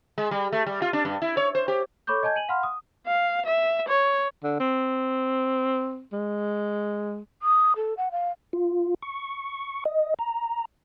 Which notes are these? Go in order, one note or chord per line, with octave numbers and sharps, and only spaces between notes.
G#3
G3
A3
G3
F4
D4
G2
E4
C#5
C5
G4
A4 C#5 B5 C#6 D6 G6
D#5 G#5 A5 G6 G#6
G#5 D#7 F#7
F5 F#5 B5 C6 F6
D#6
F5
E5
C#5
D3
C4
G#3
D#6
A4
F#5
F5
F4
C#6
D#5
A#5